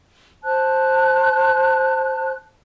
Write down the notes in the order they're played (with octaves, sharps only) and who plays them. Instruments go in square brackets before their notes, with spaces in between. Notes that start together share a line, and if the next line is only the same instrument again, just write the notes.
[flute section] C5 A5 F#6